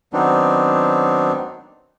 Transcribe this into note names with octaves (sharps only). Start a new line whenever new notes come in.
D#3 F#3 B3 C4 D4 D#4